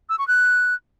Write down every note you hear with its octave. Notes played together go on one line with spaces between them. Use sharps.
E6
C#6
F#6